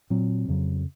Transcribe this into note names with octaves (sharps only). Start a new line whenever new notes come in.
A#2 F#3 C4
F2 C#3 F#3